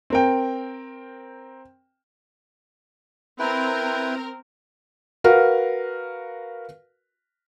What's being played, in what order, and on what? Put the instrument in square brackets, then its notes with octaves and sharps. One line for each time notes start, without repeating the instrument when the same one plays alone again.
[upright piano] C4 A#4 G5
[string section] C4 A#4 [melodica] E4 B4 G5
[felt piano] F#4 A#4 B4 F5